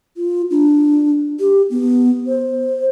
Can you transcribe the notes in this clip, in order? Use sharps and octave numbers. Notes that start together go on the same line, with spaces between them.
F4
D4
G4
B3
C5